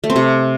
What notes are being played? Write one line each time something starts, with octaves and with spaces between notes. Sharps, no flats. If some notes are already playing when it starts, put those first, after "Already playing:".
A3
C4
C3